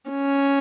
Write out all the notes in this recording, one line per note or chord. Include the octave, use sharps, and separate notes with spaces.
C#4